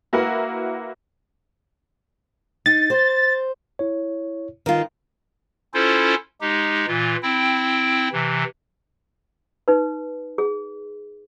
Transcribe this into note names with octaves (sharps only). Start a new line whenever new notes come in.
A#3 E4 F#4 A#4 B4 F#5
D#4 A6
C5
E4 C#5
D#3 F4
C#4 E4 F4 A4 C5
G#3 D#4 G4
A#2 E3 F4
C4 E4 G5
C3 E3
D#4 B4
G#4